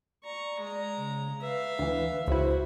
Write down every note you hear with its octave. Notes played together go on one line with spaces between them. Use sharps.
D5 A#5 C#6
G#3 A#5
C#3
B4 E5 F5
D2 E3 B4
C#2 E4 F#4 C5